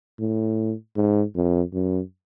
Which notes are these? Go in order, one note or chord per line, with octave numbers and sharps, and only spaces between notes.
A2
G#2
F2
F#2